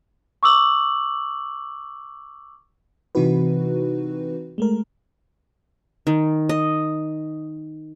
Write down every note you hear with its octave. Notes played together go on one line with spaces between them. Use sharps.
C#6 D6 E6 F#7
C3 E3 C4 D#4 F#4 B4
G#3 A3 A#4
D#3
D#5